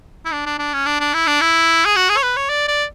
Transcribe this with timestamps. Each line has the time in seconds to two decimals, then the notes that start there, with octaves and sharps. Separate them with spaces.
0.25 E4
0.33 D4
0.46 D4
0.59 D4
0.73 C#4
0.86 D4
1.00 D4
1.14 E4
1.27 D4
1.41 E4
1.85 G#4
1.96 F#4
2.09 G#4
2.16 C#5
2.23 B4
2.37 C#5
2.49 D5
2.68 D5